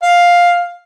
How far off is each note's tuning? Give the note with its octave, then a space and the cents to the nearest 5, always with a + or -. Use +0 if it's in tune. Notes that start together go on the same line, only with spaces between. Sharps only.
F5 +10